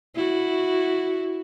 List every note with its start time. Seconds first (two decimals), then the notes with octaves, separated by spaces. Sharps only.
0.15 E4 F#4